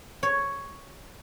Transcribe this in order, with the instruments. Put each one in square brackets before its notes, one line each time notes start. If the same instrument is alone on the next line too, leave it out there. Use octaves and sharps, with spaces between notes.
[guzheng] C#5